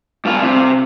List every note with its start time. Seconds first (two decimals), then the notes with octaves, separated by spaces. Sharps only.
0.25 G2 F4
0.42 C3